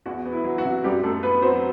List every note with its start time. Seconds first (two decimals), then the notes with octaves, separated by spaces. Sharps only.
0.06 E2 F#4
0.25 B3
0.32 E4
0.44 F#3
0.58 F#4
0.64 C3
0.84 F#2 G3 G4
1.03 F#2 A3 A4
1.23 B3 B4
1.42 F#3 C4 C5